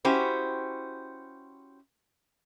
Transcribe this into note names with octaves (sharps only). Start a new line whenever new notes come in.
C#4 E4 F#4 G4 C5